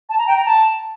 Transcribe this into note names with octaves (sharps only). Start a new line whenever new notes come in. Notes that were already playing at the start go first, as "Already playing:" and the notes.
A5
A#5
G5
A#5
A5